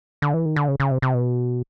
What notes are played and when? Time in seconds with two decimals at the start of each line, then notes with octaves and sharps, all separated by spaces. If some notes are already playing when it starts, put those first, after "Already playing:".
0.22 D3
0.34 E3
0.46 D#3
0.56 D3
0.68 C#3
0.80 C#3
0.91 C3
1.02 C3
1.14 B2